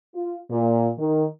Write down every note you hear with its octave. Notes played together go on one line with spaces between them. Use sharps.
F4
A#2
D#3